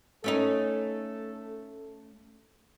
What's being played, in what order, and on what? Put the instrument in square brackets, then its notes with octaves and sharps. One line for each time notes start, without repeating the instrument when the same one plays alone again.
[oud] A3 C#4 D#4 [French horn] A4